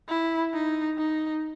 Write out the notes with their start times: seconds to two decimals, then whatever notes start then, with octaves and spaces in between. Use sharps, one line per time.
0.09 E4
0.54 D#4
0.98 D#4